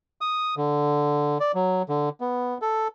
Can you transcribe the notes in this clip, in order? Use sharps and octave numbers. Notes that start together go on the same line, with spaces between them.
D#6
D3
D5
F#3
D3
B3
A4